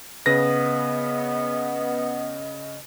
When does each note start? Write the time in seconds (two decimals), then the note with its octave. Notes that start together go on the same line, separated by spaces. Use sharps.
0.26 C#3 B3 B4 D#5 A#6